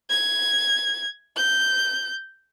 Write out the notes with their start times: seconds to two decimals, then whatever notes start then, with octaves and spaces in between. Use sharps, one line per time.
0.10 G#6
1.37 G6